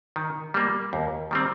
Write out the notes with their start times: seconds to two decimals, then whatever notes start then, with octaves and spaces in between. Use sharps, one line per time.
0.16 D#3
0.54 G3 A#3
0.93 D#2
1.31 D#3 G3 C4